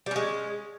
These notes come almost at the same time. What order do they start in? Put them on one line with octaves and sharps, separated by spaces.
G3 C#4 G#3